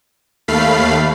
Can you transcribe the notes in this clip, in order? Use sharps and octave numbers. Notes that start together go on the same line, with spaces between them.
D#2 A3 F5 B5 C7